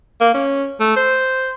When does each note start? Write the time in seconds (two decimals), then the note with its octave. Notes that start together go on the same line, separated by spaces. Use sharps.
0.21 A#3
0.34 C#4
0.80 A3
0.96 C5